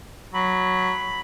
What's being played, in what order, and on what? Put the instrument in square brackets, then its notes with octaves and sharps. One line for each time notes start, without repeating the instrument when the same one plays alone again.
[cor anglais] F#3 [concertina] B5